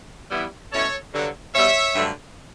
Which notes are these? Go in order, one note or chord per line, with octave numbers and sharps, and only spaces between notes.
E3 G3 B3 E4
B2 A3 C#4 E4 A4 C#5
G2 D3 F#3
B2 G3 B3 C#5 E5
G2 D3 F#3 A3 D4